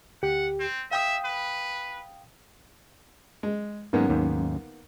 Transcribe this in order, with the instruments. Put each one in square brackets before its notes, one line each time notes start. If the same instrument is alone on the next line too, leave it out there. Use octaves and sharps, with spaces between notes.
[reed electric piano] D2 G4 [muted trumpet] F#5
[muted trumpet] C4
[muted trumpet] E5 [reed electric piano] F5 G5 D#6
[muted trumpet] B4
[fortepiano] G#3
[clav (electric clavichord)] G#2 G#3 [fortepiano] D#3 A#3 B3 [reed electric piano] F#3 C#4
[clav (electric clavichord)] D#2 G#2